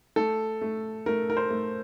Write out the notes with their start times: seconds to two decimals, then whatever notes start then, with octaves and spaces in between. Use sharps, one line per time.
0.16 A3 A4
0.62 A3
1.06 A3 A#4
1.30 A#4
1.37 C5
1.50 A3